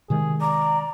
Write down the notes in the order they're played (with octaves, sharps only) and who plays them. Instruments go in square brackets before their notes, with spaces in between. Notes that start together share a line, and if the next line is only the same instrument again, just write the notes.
[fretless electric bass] C3 D#3 G#3 [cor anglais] G#4
[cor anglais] D5 [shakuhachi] A#5